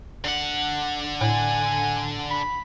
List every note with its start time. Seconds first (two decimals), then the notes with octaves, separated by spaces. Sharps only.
0.24 D3 F#5
1.21 A2 G#5
2.30 B5